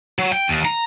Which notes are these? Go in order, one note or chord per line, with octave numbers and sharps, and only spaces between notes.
F#3
G5
D#2
A#5